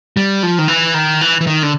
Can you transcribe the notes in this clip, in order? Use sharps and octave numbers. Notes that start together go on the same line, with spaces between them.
G3
F3
D#3
E3
D#3
E3
E3
D#3
D3